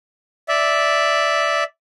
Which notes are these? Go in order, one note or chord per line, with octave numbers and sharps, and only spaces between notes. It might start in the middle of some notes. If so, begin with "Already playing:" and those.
D5 E5